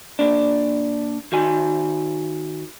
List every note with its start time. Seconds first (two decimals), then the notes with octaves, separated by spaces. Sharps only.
0.19 A#2 D4
1.32 D#3 F#4 G#5